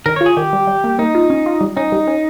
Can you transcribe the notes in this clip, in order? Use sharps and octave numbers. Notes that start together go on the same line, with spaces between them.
D#3 A#4
F4 C#5
G#4
D#3 G4
G3
G3
A#3
A#3 D#4
F4
C#4
F4
G3
C#4 D#4
G3
C#4